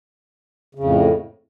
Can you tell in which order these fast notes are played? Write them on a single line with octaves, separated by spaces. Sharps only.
C#3 F2 A2